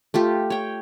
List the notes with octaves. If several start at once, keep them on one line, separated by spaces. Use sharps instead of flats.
A3 F4 G4
C#5 G5